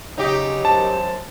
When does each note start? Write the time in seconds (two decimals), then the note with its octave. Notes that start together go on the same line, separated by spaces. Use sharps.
0.18 C#3 F#3 D#4 G4
0.65 F#2 C5 A5